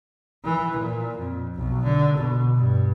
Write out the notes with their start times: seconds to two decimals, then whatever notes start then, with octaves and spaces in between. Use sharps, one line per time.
0.44 E3
0.77 A#2
1.18 F2
1.55 B1
1.84 D3
2.17 B2
2.56 G2